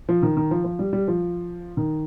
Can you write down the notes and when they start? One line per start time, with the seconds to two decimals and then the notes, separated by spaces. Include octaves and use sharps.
0.09 F3
0.23 D#3
0.37 D#3
0.51 F3
0.64 F3
0.79 G3
0.93 G3
1.08 F3
1.77 D#3